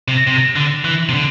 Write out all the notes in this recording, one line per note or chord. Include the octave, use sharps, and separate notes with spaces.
C3
C3
D3
E3
C3
D3